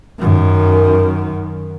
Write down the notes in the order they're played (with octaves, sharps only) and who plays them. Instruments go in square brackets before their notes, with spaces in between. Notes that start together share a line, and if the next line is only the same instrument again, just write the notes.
[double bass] F#2 D#3